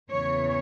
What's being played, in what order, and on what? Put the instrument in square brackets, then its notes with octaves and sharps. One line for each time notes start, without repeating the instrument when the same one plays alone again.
[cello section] E2 C#3 E3 C#5